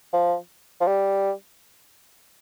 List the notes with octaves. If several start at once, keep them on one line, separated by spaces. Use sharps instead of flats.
F3
F3
G3